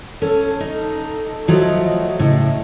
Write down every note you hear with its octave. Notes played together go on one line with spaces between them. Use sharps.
C#4 A4
D#4
F3 F#3 A3 D#5
A2 C#3